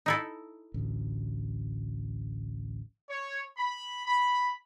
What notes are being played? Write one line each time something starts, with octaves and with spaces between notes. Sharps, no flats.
D#4 E4 A4
A1 D2
C#5
B5
B5